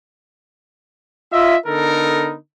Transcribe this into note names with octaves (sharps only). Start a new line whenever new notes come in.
F4 D#5 E5
D3 B3 D#4 A4 A#4